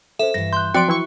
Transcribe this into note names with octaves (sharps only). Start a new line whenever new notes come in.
C#4 A4 C5 E5
G2 E3 A#6
C6 F#6 G6
F3 F#3 C4 F#4 D5 G5 C6 D7
E3 E4 C#6